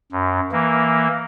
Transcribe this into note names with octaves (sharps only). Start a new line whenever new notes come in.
F#2
E3 A#3